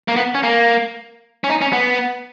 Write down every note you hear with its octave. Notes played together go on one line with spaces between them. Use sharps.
A#3
B3
C#4
A#3
C#4
D#4
C#4
B3